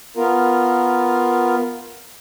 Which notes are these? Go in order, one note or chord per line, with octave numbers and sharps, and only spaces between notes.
B3 F4 A#4